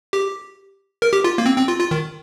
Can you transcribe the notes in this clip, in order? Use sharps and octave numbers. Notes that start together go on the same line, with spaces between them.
G4
A#4
G4
F4
A#3
C4
C4
F4
F4
D#3